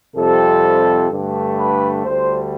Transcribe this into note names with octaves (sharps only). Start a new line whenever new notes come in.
F2 C3 G3 A4
G2 D3 A3
B4
D2 D3 G3 C5